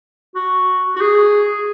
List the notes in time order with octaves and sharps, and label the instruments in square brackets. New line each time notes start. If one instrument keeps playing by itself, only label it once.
[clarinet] F#4
F#4
G#4